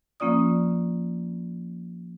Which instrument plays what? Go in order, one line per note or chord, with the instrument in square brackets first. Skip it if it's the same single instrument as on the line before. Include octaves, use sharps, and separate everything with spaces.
[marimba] F3 A#3 C#4 F4 D5 D#6